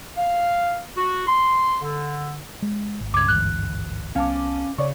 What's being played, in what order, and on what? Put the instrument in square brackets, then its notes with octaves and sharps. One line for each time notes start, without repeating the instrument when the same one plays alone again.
[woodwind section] F5
F#4
C6
D3
[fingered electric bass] G#3
G#1
[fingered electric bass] C#2 [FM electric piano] G2 [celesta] D6 G#6
[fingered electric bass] G#1 D2 E3 [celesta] F#6
[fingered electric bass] C2 B3 [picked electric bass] C#4 [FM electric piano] F5 A5 D6
[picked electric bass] C#3 [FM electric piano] C#5 D5 C#6